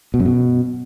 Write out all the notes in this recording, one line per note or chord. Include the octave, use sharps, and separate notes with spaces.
B2
F#2
B2